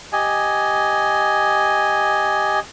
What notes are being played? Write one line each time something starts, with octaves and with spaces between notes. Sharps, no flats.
G4 D#5 G#5